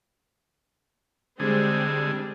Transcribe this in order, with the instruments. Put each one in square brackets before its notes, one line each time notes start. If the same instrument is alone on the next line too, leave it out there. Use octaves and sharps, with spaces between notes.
[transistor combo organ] D3 G#4 [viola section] G3 G#3 C4